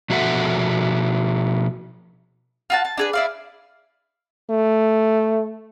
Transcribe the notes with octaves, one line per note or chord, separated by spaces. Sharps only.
B2 F3 F#4 A4 E5 F#5
F4 F#4 A5
A5
D4 G#4 B4
E4 D5 F5
A3